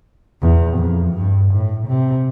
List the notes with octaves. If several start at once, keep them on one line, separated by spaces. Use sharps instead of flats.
E2
F2
G2
A2
C3